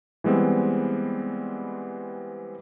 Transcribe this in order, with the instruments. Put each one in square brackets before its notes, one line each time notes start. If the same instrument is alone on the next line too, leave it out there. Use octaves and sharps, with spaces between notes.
[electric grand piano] E3 G3 G#3 B3 C4